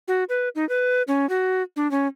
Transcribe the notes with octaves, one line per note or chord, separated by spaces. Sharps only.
F#4
B4
D#4
B4
C#4
F#4
D4
C#4